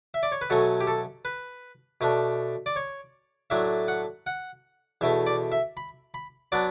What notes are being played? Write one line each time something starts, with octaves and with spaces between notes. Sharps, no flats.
E5
D5
C#5
B4
B2 F#3 A3 C#4 A4
G4
A4
B4
B2 A3 D4
D5
C#5
A2 F#3 A3 D4 E5
F#5
F#5
E2 B2 A3 E5
D5
E5
B5
B5
F#3 B3 D4 D5